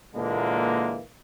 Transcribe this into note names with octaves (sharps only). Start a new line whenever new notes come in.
A#2 D3 E3 G#3 A#3